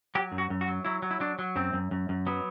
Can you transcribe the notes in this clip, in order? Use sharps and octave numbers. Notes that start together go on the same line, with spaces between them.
F#3 G4
F#2
F#4
F#2
F#4
F#3
F#3 E4
F#3
E4
F#3 D4
F#3
F#2 C4
F#2
F#2
F#2
F#3 B3